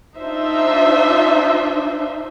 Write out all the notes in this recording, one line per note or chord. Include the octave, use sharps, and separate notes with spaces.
D4 D#4 F4 C5 E5